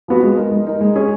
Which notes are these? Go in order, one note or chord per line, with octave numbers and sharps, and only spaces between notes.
F3 B3 F#4
G#3
D#4 A#4
G#3
D#4 A#4
G#3
C#4 G#4 C#5